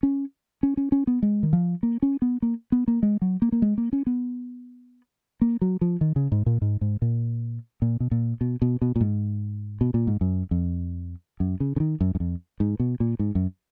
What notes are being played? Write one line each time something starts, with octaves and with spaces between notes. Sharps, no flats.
C#4
C#4
C#4
C#4
B3
G#3
D#3
F3
A#3
C#4
B3
A#3
B3
A#3
G#3
F#3
A#3
A#3
G#3
A#3
C#4
B3
A#3
F#3
F3
D#3
C#3
G#2
A#2
G#2
G#2
A#2
A#2
B2
A#2
B2
B2
B2
A#2
G#2
B2
A#2
G#2
F#2
F2
F#2
C#3
C#3
D#3
F#2
F#2
F2
G#2
B2
A#2
G#2
F#2